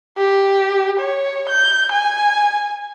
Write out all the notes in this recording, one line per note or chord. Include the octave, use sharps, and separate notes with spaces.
G4
C#5
G6
G#5